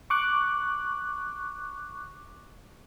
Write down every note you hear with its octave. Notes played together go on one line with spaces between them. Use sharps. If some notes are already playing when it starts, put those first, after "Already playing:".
C#6 D6 F#6